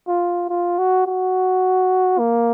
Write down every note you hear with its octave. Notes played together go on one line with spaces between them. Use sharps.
F4
F4
F#4
F#4
A#3